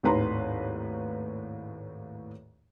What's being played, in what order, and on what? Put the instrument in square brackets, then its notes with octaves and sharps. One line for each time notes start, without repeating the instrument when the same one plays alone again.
[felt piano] G#1 D#2 A2 B4 A#5 C6